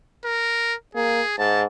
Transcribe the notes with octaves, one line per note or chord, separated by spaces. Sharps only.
A#4
A#3 G#4
G#2 A5